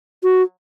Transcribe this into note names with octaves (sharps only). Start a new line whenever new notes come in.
F#4